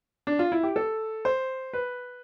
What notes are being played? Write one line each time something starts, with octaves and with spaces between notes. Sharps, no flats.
D4
F4
E4
G4
A4
C5
B4